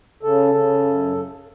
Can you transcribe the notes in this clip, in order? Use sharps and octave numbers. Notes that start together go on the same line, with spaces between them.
C#3 A4
C#3
F#2